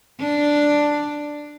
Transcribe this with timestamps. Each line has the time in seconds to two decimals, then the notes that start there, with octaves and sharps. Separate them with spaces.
0.20 D4